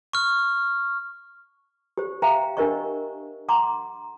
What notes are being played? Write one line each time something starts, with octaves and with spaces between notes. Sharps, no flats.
C#6 F6
G4 C5
C5 E5 F5 G5 A#5
D4 G4 A#4 C5 D#5 C#6
F#5 A#5 C6 D6